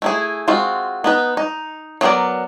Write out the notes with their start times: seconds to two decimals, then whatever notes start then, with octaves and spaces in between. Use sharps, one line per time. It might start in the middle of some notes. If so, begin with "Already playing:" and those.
0.02 A3 E4 G#4
0.48 G#3 C4 F4 F#4
1.04 B3 D#4 B4
1.37 D#4
2.01 F#3 B3 G#4 A#4 D5